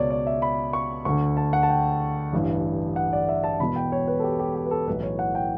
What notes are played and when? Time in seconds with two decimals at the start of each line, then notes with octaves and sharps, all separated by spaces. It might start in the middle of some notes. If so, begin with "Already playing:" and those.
Already playing: C#2 B2 C#5 D5
0.10 D5
0.27 E5
0.42 B5
0.73 C#6
1.05 D2 D3 C#6
1.37 A5
1.53 F#5
1.63 A5
1.69 G5
2.33 A1 G2 E3
2.96 F#5
3.13 D5
3.29 E5
3.44 A5
3.60 E1 E2 B2 B5
3.76 G5
3.92 C#5
4.08 B4
4.20 A4
4.24 G4
4.39 G4
4.55 G4
4.66 B4
4.71 A4
4.87 B1 A2 E3 B4
5.03 C#5
5.19 F#5
5.35 G5